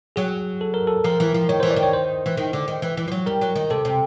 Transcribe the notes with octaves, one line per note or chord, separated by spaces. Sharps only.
F#3 G#4
A4
A#4
A4
F3 A#4
E3
F3
D#3 C#5
E3 C5
D5
D#3
C#5
C5
E3
D#3
D3
D#3
E3
E3
F3
F#3
G3 A#4
F#3
D#3
C3 A4
C3